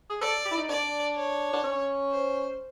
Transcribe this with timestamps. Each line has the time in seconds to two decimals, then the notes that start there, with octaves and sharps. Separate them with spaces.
0.10 G#4
0.21 A4 D5
0.45 G4
0.51 E4
0.57 D#4
0.69 D4 D5
1.16 C#5
1.53 D4
1.63 C#4
2.11 C5